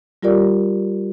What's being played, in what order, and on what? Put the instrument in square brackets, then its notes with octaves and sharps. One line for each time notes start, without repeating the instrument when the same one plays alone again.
[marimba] G3 F4 G4 A#4 D5